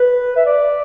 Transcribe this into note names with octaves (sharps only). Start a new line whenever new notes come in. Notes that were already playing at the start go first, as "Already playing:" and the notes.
Already playing: B4
E5
D5